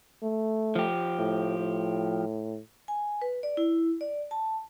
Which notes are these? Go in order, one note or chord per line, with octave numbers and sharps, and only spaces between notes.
A3
F3 G4
A2
A2
G#5
B4
D5
E4
D5
A5